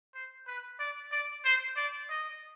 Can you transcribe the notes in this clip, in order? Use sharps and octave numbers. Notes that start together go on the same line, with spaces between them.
C5
B4
D5
D5
C5
D5
D#5